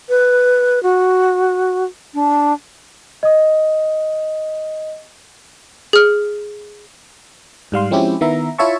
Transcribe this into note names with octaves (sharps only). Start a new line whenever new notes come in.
B4
F#4
D4
D#5 D#6
G#4 F6
G#2 G3 F5 C6
F3 G#3 C4 C#4 E4 G4
D#3 B3 E4 E5 A#5
E4 F4 C#5 E5 A5 C#6